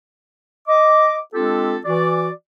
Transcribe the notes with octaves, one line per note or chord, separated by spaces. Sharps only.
D#5 D6
G#3 C4 D4 F4 G4 A4
E3 F#4 D5